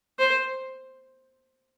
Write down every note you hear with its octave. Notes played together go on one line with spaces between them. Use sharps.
C5